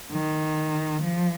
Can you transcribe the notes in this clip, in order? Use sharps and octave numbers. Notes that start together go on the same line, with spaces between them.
D#3
F3